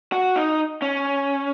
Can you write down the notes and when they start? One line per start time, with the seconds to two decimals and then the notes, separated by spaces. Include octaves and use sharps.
0.12 F#4
0.36 D#4
0.82 C#4